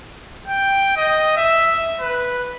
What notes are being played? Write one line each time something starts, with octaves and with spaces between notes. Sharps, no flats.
G5
D#5
E5
B4